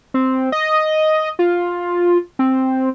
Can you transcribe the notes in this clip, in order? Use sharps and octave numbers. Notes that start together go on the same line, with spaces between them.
C4
D#5
F4
C4